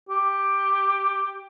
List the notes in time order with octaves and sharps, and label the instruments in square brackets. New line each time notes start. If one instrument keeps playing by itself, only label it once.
[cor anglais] G4